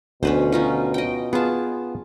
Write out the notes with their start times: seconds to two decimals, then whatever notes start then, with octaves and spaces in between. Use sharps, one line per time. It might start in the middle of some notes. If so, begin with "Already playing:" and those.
0.23 D2 B2 C#4 B4 C5
0.52 C#4 D#4 F4
0.94 D#5 G5
1.33 B3 F4 G#4 A5